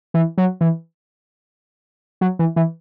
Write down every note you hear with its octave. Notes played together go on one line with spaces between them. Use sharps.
E3
F#3
E3
F#3
E3
E3